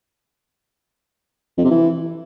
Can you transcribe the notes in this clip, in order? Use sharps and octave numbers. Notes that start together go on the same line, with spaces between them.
F2
C3
E3